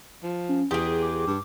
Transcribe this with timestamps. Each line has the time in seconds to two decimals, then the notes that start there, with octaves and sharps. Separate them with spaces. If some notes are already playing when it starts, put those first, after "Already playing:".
0.23 F3
0.49 C#4
0.71 E2 G4 G#4 D#6
1.02 D6
1.27 G2